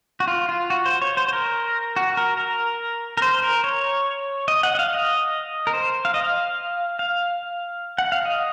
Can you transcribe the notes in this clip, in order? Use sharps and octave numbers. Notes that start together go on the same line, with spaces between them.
F#4
F4
F4
F#4
C5
C#5
C5
C5
A#4
F#4
A#4
A#4
A#4
C5
A#4
C#5
D#5
F#5
D#5
F5
D#5
A#4
C5
F5
D#5
F5
F5
F#5
F5
D#5